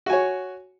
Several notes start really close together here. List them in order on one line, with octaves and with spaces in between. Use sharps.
F#4 G#5 C#5